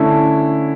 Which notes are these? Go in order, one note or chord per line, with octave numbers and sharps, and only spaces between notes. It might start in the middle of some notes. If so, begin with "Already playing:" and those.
Already playing: D3 A3 C#4 E4